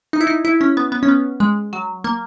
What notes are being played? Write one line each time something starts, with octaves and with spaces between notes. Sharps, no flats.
D#4
E4
D#4
E4
C#4
B3
B3
C#4
B3
G#3
F#3
A#3